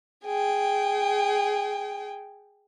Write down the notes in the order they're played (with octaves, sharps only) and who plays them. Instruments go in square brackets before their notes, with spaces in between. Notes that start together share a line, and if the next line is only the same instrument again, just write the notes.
[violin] G#4 G5